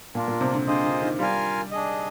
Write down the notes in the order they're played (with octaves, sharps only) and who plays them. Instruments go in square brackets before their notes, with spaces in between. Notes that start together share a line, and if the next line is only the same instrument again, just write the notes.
[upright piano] A#2 [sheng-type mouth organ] D4 F4 A#4
[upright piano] A#2
C3
D3
[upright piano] D3 [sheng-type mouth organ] F4 G#4 C5 D#5
[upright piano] D3
D#3
[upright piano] G3 [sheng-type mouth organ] F4 A#4 F5 G#5
[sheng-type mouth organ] D4 G#4 D#5